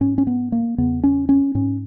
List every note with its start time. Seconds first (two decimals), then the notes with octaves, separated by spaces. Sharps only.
0.01 G#2 C#4
0.18 C#4
0.27 B3
0.52 A#3
0.78 E2 C#3 B3
1.04 C#4
1.29 C#4
1.55 G#2 C#4